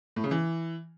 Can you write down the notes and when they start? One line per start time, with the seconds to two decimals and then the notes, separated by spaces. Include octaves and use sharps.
0.16 A2
0.24 C#3
0.31 E3